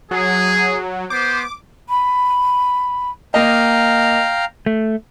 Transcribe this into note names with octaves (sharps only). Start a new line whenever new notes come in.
F#3 G#4
B3 C5 D6
B5
A#3 D#5 F5 G5 A#5
A3